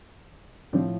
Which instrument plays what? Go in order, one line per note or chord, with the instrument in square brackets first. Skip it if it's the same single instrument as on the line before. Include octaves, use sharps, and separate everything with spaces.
[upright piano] A2 F3 C4 D4